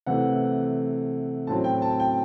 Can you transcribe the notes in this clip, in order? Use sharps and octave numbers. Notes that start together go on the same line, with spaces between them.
C3 E3 A3 F#5
A2 F#3 C4 A5
G5
A5
G5